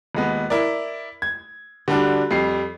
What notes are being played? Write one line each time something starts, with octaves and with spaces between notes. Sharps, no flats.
D#1 G#3 B3
E4 A#4 D5
G#6
D3 G3 D4 F#4
F2 G3 C7